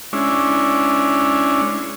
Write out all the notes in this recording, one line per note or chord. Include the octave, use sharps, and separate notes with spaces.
G#3 C#4 D4 E4